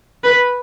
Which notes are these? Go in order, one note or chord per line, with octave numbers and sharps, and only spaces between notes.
B4